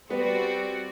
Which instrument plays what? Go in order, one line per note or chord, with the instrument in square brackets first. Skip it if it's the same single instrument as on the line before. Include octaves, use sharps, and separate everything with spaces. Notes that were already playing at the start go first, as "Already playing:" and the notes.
[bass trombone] G3 [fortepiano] B3 [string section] C4 F#4 D5